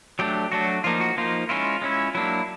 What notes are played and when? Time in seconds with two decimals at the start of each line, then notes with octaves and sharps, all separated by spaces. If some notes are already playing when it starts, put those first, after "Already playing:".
0.19 F#3 A3 D4 G4
0.52 F#3 A3 D4 F#4
0.84 F3 A#3 D#4 F4
1.00 F#4
1.17 F3 A#3 D#4 F4
1.49 G#3 C#4 E4 F4
1.82 G#3 C#4 E4
2.15 F#3 A#3 D4 E4